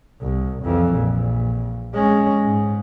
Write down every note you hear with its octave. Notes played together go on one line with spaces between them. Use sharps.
C2
F2 E3
A#1
G#3 C#4
G#2